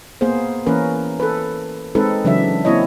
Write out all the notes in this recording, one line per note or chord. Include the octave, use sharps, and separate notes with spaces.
A#3 B3 G#4 C5
E3 A#3 C#4 A#4 B4
A4 B4
G#3 C4 D#4 A4 B4
C#3 E3 F#3 D4 E5
A#3 C4 E4 C#5 D#5